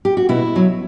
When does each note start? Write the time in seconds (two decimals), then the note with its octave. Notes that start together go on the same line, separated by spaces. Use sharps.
0.05 G4
0.17 F#4
0.29 B2 E4
0.56 F#3